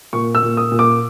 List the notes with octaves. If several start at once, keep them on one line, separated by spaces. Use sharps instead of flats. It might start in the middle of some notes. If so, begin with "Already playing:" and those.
A#2 C#6
E6
A#2
D#6
A#2
D6